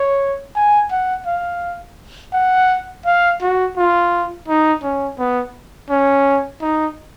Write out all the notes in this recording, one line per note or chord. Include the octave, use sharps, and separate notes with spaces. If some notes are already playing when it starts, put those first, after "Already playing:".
Already playing: C#5
G#5
F#5
F5
F#5
F5
F#4
F4
D#4
C#4
B3
C#4
D#4